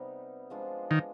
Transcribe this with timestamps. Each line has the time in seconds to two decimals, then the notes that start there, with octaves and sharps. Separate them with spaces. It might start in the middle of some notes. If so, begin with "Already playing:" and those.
Already playing: C3 G3 B3 D#4
0.50 F3 G#3 D4 F4
0.91 D#3